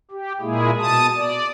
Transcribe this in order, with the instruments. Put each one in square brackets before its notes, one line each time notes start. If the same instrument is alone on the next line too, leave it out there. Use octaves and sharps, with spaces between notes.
[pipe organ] G4
A#2 G#3 A#3 E4 G#4
B2 A5 D#6
D5